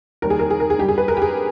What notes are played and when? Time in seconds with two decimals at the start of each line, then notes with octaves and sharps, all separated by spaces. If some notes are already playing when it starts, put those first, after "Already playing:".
0.22 D#2 D#3 G3 A#4
0.30 G#4
0.39 A#4
0.50 G#4
0.60 A#4
0.70 G#4
0.79 G2 G3 G4
0.88 G#4
0.98 B4
1.08 A#4
1.17 G4
1.22 G#4